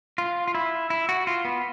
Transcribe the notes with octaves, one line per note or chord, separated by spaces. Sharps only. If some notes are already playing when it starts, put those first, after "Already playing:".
F4
F4
E4
E4
F#4
F4
B3